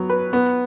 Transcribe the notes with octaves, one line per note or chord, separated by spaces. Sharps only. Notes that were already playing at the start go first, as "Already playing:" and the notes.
Already playing: F#3 B3
B4
B3